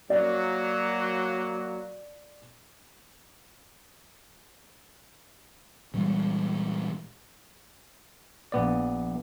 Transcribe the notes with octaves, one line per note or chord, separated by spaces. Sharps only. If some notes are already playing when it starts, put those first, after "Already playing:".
F#3 A#3 D5
A#2 E3 G3 G#3
A#1 B3 D5